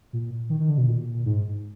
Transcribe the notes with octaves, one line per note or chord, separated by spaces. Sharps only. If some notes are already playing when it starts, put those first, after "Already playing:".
A#2
D#3
D#3
D3
B2
A#2
G#2